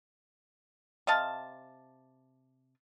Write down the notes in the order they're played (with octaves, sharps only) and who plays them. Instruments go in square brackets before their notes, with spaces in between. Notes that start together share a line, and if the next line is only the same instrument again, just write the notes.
[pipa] C3 D#5 F5 A5